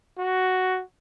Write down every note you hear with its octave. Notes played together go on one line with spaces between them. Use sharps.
F#4